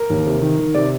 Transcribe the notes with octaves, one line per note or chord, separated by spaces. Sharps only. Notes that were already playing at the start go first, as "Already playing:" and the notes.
Already playing: A#4
D#2
C3
D#3
D#3
C3 D5